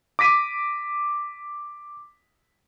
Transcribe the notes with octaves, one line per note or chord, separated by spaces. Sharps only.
D6 A#6 B6 D#7